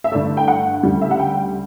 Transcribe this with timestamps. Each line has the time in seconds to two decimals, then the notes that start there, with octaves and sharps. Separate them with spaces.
0.04 E5
0.12 G2 D3 A3 D5
0.37 G5
0.48 F#5
0.83 D2 C#3 G3
1.01 E5
1.11 F#5
1.19 G5